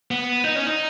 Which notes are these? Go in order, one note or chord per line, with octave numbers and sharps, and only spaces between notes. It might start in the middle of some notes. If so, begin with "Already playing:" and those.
B3
D#4
C#4
D#4